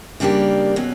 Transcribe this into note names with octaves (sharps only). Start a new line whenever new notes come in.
C#3 G3 A#3 D4 G4
B2 F#3 C#4